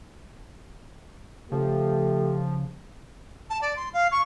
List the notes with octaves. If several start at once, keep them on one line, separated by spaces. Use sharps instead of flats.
C#3 F3 A3 G4
A5
D5
C6
F5
C#6